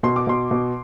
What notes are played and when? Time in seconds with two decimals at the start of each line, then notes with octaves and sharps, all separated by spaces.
0.03 B2 C6
0.16 D6
0.27 B2 C6
0.51 B2